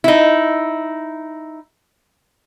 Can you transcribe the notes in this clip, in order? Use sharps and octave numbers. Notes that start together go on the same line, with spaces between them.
D#4 E4